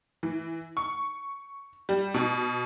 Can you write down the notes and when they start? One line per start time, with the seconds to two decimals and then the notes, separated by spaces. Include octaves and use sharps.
0.23 E3
0.77 C#6
1.89 G3
2.14 B2